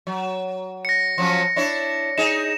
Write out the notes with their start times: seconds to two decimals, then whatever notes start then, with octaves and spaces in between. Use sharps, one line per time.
0.07 F#3
0.85 A#6 C#7
1.18 F3 F#3 C#4
1.56 D4 E4 C#5
2.18 D#4 G#4 E7